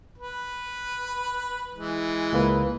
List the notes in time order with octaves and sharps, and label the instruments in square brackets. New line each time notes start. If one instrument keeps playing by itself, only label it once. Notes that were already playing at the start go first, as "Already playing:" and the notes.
[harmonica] B4
E3 G#3
[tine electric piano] C#2 A#3 B4